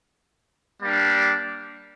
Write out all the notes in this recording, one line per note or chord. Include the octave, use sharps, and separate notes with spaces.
G3 A#3 D4